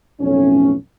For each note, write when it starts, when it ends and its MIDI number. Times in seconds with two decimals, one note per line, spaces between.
0.21 0.74 35
0.21 0.74 41
0.21 0.74 45
0.21 0.74 57
0.21 0.74 61